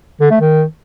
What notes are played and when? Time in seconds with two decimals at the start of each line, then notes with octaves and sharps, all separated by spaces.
0.21 D3
0.31 A3
0.40 D#3